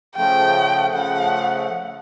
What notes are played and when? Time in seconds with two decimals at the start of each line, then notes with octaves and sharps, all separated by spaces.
0.16 C#3 F3 A3 G5
0.93 C#3 F3 A3 F#5